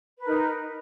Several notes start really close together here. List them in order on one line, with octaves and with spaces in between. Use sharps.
B4 A#4 D#4